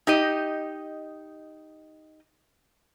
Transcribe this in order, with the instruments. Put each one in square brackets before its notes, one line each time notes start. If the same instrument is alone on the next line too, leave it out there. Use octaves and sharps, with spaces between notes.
[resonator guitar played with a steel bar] D#4 G4 D#5